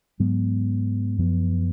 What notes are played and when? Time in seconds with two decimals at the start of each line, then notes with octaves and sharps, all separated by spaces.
0.20 G#2 F#3 B3
1.18 F#2 F3 B3